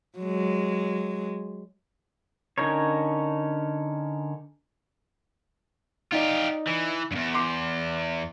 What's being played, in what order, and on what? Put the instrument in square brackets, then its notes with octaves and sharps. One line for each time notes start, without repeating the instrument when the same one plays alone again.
[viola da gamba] F#3 G#3
[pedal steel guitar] D3 C#4 D#4 A#4 C#5
[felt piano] D#4 D5 [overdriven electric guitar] F4 G4
[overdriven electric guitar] E3
E2 G2
[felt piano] C6 D6 C7